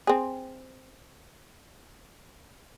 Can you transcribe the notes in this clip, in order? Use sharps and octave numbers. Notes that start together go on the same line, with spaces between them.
C4 G#4